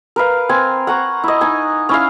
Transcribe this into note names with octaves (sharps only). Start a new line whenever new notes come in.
A#4 B4 F5
C4 G#5
F#5 A#5 C#6
E4 D#5
D#4 G#5
C#4 E4 F5